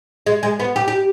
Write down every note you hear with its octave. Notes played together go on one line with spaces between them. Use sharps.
G#3
G#3
B3
G4
G4